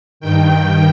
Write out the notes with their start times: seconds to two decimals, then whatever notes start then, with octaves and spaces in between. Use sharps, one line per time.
0.20 G2 D#3 G5